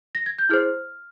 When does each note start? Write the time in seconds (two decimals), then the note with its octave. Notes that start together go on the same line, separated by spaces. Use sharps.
0.15 A#6
0.26 G#6
0.39 G6
0.49 E4 G#4 C5 F6